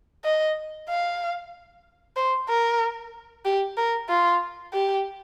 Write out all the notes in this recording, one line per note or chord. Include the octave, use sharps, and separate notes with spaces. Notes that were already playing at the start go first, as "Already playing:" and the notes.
D#5
F5
C5
A#4
G4
A#4
F4
G4